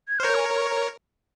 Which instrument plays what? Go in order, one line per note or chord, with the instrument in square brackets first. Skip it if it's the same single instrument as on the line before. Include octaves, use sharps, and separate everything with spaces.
[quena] G#6
[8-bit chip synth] C5 [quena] F6
[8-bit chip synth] A#4 C#5 [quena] G6
[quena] G#5
A#5
C#6
A#5